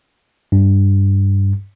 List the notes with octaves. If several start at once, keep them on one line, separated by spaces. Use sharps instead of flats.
G2